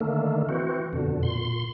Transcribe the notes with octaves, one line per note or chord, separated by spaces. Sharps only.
D3 D#3 A3 A#3
E3 C4 F#4
F2 B2 D3
A#2 C6